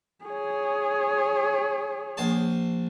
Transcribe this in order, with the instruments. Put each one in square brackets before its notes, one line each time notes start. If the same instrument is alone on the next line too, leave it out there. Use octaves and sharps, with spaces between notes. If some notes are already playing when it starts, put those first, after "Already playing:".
[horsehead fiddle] G#4 C#5
[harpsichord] A#1 C5 A5